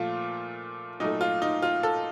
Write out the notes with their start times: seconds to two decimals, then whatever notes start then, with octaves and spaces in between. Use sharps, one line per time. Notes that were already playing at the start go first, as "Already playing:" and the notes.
Already playing: A#2 F3 A3 F4
1.00 A#2 F#3 A3 D#4
1.21 F4
1.42 D#4
1.62 F4
1.83 A4